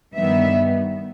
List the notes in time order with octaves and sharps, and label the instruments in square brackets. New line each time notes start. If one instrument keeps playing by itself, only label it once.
[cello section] G2 D#3 G3 B3 E5